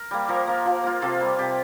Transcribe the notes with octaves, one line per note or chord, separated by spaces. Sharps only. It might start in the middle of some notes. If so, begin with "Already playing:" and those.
Already playing: A#4
G3 A#3
F3 G4 A#4
A#3 F4
F3
A#3 F4
C3 F4 A4
G3 A#3
C3 G4